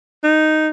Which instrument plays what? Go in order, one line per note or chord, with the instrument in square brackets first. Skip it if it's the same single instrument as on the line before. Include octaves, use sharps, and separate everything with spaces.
[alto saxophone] D#4